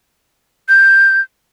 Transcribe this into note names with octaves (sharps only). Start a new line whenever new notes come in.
G6